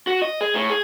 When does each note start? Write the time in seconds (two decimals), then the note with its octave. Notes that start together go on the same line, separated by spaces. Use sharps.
0.07 F#4
0.22 D#5
0.41 G#4
0.55 A2
0.70 G#4